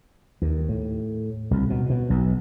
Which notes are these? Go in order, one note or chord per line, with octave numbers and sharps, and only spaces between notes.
D#2
A2
C2
B2
B2
B1